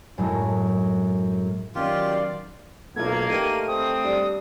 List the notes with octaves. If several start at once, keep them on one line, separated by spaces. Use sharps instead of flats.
F#2 A2 G#3
D#3 F#3 C#4 F4 G4 D5 C6
B1 A3 A#3 F4 G#6
A3 D#4 G4 A#4 D#7
C4 D#6
G3 D4